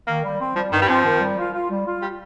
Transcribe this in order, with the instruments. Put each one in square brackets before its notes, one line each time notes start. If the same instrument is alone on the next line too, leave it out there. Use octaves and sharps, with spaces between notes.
[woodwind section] D#3 [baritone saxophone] A#3
[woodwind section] G3
C4
[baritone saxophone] F3 [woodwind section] G3
[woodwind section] G2 [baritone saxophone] D#3
[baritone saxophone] G3
[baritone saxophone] F3 [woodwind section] C4
[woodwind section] D#3
G3
F4
F4
G3
F4
[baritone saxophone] G3